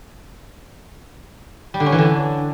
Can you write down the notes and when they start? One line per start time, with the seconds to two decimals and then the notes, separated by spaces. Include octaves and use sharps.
1.74 G3
1.80 D3
1.86 C#4
1.92 E3
1.98 D3